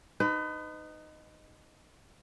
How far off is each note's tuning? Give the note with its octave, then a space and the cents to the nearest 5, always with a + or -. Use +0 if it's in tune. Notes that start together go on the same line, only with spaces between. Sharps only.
D#4 -10 B4 +35